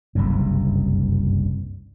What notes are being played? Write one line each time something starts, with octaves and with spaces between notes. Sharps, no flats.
F#1 C2 G2